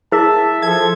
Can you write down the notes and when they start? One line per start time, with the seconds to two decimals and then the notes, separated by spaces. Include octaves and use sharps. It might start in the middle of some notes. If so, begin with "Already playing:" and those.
0.12 E4 G#4 A#4 E5 A5
0.62 F3 A4 G#6